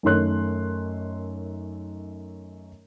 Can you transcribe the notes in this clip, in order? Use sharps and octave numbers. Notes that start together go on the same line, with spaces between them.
F#2 D#3 A3 C#5 C6 F#6